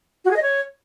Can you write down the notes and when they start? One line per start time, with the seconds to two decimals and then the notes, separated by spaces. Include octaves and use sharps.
0.25 F#4
0.31 G#4
0.36 D#5
0.42 C#5